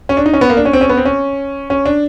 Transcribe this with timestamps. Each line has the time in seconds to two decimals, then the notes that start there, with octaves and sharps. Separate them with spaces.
0.09 C#4
0.17 D4
0.26 D#4
0.34 C#4
0.41 B3
0.50 A#3
0.57 D4
0.65 C#4
0.73 C4
0.81 C#4
0.89 B3
0.97 C4
1.05 C#4
1.70 C#4
1.86 D4